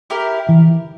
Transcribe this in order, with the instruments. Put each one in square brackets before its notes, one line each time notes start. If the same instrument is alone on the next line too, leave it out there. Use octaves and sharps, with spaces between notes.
[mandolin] E4 G4 A#4
[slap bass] E3